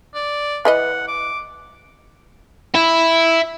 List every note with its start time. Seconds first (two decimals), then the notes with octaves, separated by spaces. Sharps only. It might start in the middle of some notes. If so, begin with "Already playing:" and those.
0.14 D5
0.65 E3 B4 D#5 F#5
1.08 D6
2.75 E4